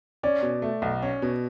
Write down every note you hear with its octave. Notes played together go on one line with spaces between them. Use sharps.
C#4 D5
B2
A3
B1
C#4
B2